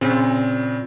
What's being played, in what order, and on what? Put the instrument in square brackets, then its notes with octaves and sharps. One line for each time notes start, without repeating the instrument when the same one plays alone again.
[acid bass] A#2 [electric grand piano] C#3 C4